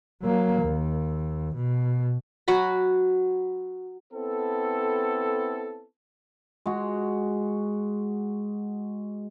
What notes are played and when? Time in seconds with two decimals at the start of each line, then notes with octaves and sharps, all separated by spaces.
0.22 F#3 A#3
0.61 D#2
1.55 B2
2.48 F#3 F#4 F#5 B5
4.13 B3 C4 E4 A4
6.66 G#3 F#4